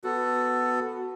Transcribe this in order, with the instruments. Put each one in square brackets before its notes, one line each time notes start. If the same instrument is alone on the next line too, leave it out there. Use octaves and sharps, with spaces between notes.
[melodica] B3 A4 [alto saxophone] F#4